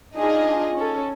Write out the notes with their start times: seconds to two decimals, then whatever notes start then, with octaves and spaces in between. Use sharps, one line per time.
0.17 D4 D#4 F4 G#4 D#5
0.76 C#4 A4